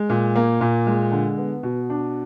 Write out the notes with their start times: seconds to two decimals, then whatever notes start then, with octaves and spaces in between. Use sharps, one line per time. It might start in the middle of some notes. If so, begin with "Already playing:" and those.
Already playing: G#3
0.09 A#2
0.36 A#3
0.61 A#2
0.87 G#3
1.12 D3
1.38 B3
1.63 B2
1.90 D4